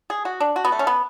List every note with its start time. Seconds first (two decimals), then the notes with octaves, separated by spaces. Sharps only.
0.10 G#4
0.25 F#4
0.40 D4
0.56 F#4
0.65 B3
0.72 A3
0.79 C#4
0.87 B3